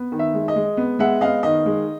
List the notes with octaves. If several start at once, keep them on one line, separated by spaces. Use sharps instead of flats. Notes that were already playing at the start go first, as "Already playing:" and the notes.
Already playing: B3
D#3
E5
G#3
D#5
G#3
B3
G#3 E5 F#5
B3 D#5 F5
D#3 D#5
G#3